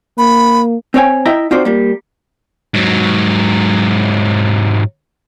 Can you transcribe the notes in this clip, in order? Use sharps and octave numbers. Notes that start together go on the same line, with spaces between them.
A#3 B5
C4 C5 C#5 G5 G#5
E4 D#5 E5 G5 A#5
C4 D#4 F4 F#4 C5 D5
G3 A#3
G#2 F#3